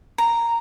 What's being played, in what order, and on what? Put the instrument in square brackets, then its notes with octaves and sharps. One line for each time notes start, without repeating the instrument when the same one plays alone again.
[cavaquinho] A#5